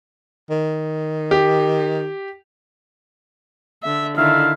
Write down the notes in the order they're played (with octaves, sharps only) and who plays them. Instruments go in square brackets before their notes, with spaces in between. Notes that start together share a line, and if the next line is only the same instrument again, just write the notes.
[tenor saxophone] D#3
[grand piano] G4
[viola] D3 E5
[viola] D3 D#3 [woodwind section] D#4 E4 E5 [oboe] F5